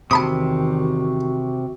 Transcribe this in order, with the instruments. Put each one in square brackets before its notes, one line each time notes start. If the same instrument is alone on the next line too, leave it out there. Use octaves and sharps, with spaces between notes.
[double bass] E2 D#3 [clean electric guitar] C3 [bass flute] F#4 [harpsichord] A5 B5 D#6